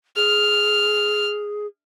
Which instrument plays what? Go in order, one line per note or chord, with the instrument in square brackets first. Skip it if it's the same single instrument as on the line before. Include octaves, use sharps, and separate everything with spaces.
[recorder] G#4 [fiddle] F6